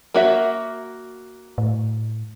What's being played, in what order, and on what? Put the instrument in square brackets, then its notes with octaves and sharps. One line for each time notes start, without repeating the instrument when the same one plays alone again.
[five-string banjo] A#3 F#4 E5
[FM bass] A2